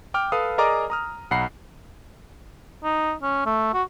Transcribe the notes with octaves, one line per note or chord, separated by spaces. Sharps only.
G5 D6 F6
A4 B4 F5 D#6
G#4 A#4 D5 D#5 A#5 D6
A#5 D#6 F6
B1 F#5 A#5 B5 C7
D#4
C#4
A3
F#4